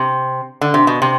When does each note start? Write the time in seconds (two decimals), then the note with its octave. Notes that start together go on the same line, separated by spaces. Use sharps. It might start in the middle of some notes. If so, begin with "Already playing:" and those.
Already playing: C3
0.61 D3
0.74 C3
0.87 B2
1.02 C3